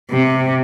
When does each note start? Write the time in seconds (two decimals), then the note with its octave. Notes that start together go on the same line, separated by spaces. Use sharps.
0.11 C3